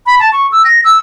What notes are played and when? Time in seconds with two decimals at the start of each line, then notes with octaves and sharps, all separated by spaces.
0.06 B5
0.20 A5
0.32 C#6
0.52 E6
0.65 A#6
0.84 E6